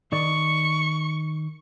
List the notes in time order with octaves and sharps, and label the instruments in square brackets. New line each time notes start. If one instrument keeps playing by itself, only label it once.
[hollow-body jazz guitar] D#3 D5 [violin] C#6